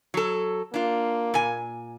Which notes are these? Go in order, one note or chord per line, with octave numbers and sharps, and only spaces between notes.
F#3 A4
A#3 D4 F4
A#2 G#5